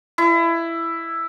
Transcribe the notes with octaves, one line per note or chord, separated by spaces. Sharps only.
E4